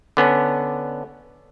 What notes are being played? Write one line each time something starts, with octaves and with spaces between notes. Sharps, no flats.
D3 B3 C#4 D4